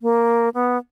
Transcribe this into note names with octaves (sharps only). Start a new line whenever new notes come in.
A#3
B3